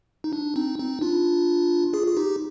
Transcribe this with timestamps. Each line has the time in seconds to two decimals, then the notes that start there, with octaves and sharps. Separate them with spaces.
0.24 D#4
0.33 D4
0.56 C4 D#4
0.78 C4 D#4
1.01 D4 F4
1.93 F4 G#4
2.07 G#4
2.17 D#4 G4